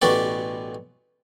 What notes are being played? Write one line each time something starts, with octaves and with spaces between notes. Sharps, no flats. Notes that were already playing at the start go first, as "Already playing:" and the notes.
A1 B2 F#4 G4 D5